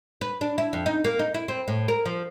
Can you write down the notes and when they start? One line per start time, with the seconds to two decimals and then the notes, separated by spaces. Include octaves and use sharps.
0.21 B4
0.41 D4
0.58 E4
0.73 F2
0.86 D#4
1.04 A#3
1.19 D#4
1.34 E4
1.48 C4
1.68 A2
1.88 A#4
2.05 F3